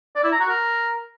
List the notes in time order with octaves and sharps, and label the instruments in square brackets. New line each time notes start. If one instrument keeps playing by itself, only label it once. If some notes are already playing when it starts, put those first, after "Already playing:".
[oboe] D5
E4
A#5
F#4
A#4